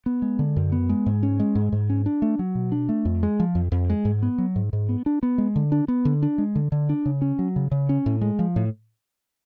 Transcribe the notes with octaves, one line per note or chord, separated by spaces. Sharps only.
B3
G#3
D3
F#2
B3
G#3
G#2
C#4
G#3
G#2
G#2
C#4
D4
A3
F#3
B2
D4
A3
F2
G#3
F3
F2
F2
G#3
G#2
B3
F#3
G#2
G#2
B3
D4
B3
G#3
D3
D4
B3
D3
D4
G#3
D3
D3
D4
C#3
C#4
F#3
C#3
C#3
C#4
A2
G#3
F3
A2